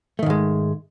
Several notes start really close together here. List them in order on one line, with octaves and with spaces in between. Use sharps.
A3 D#3 G#2 G#3